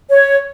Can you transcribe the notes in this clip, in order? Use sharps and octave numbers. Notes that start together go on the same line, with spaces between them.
C#5